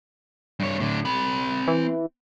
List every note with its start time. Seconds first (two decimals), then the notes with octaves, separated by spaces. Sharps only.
0.60 G2 C#5
0.80 A2 D3
1.05 C4 B5
1.68 E3